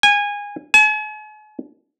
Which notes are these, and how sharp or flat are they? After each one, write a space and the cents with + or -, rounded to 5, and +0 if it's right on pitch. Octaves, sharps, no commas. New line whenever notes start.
G#5 -20
G#5 +45